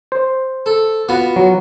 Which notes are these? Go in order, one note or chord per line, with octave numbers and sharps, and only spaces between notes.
C5
A4
B3 F4 F#4
F#3